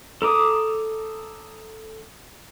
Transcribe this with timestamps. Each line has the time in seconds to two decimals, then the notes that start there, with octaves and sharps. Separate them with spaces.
0.22 A4 A#5 D6 D#6